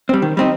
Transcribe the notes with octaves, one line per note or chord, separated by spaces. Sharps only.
G3 C4
D#3
G3 C4 D#4